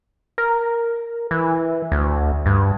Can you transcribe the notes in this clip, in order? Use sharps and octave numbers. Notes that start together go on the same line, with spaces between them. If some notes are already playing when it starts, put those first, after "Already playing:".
A#4
E3
D2
G2